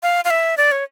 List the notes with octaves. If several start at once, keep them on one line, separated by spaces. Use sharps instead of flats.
F5
F5
E5
D5
C#5